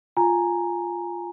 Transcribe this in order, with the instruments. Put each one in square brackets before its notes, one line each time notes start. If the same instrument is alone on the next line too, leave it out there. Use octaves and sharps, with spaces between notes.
[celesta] F4 G#5 A#5